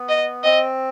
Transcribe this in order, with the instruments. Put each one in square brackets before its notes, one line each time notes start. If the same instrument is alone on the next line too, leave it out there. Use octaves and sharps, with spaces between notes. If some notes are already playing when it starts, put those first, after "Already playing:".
Already playing: [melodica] B3
[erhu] D#5
[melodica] C4 [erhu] D#5